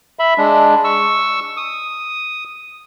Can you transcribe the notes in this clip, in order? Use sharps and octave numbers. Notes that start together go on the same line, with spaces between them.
E5 B5
G#3 D4
C#6 E6
D#6